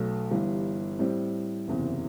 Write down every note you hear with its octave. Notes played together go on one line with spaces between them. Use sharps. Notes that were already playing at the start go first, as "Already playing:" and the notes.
Already playing: B1 B2 F#3 A3
G1 G2 E3 G3
A2 G3 C4
F#1 E2 C3